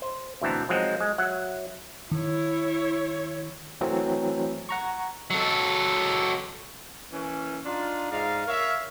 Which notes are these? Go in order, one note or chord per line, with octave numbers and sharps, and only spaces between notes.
C5
D2 B2 E3 C4 A5 A#5
F3 F#3 G#3 C4 D#4
G#3
F#3 E5 F#5
D#3 E4 C#5
E3 F#3 A3 C4
F#5 A#5 C#6
F#3 A4
E3 A#3 C#4
D4 D#4 F4
G#2 D#4 D5 F5
A#4 C#5 E5 F5